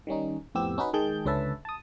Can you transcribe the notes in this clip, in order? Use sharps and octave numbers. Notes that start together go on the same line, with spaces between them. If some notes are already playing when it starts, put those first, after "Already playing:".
D#3 G3 C#4 D#4
F2 A2 B3 C4 G4 E6
C#4 D#4 F#4 B4
D#3 G#3 G#4 G5 A5 G6
C#2 D3 C#4 B4 E5 A5
A5 D#6